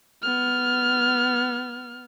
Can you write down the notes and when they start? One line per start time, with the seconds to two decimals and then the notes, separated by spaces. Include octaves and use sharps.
0.22 B3 F6